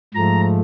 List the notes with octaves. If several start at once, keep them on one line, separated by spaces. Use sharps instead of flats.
G#2 F3 A3 A#5